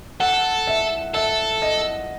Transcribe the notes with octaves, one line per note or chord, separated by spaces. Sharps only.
A4 F#5
E5
A4 E5
D#5